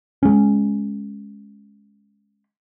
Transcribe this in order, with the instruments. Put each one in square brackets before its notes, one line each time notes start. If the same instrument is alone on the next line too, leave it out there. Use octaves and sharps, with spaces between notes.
[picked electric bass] G#3 C#4